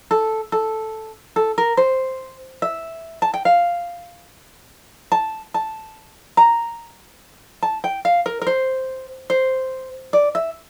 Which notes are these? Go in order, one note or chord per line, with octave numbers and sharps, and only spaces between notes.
A4
A4
A4
A#4
C5
E5
A5
G5
F5
A5
A5
A#5
A5
G5
F5
A#4
A#4
C5
C5
D5
E5